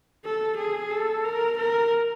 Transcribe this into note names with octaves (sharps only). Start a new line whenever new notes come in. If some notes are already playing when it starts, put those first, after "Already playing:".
A4
G#4
A4
A#4
A#4